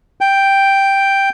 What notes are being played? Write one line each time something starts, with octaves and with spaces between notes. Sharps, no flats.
G5